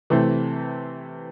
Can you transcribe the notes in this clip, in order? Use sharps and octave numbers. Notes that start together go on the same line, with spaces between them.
C3 E3 A3 C4